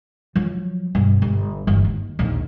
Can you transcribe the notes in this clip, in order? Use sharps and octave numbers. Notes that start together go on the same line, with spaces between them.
F3 F#3
G2 B2
G1
G1 E2
D#2
A#1 D#2